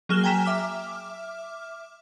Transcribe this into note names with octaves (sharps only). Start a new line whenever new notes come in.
F#3 A#3 G#4 F6 E7 G7
G5 G#5 A#5 B6 E7
E5 D6 F6